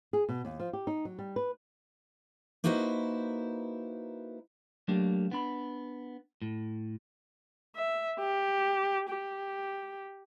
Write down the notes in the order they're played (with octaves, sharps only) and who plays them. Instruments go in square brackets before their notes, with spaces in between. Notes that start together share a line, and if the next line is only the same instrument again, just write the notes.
[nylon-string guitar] G#4
B2
D#2
F3
G4
D#4
F#3
G3
B4
[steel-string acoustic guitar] A#3 D#4 E4 F#4 B4 C5
[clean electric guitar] F#3 A3 A#3 D4 G4
B3 D4 B5
A2
[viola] E5
G4
G4